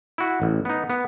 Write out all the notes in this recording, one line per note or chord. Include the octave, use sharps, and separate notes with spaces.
E4 F#4
A1
B3 D#4
B3